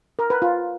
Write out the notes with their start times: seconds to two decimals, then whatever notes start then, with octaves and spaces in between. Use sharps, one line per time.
0.19 A#4
0.30 B4
0.42 F4